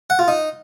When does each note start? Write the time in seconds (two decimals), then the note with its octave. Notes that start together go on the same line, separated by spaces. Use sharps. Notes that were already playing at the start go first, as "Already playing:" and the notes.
0.10 F#5
0.19 F4
0.28 D#4